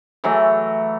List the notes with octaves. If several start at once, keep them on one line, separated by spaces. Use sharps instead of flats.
E3 F#3 A3